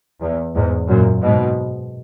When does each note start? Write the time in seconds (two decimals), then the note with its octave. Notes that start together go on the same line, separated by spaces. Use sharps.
0.22 E2
0.54 E2 G#2
0.88 F#2 A#2
1.22 G#2 B2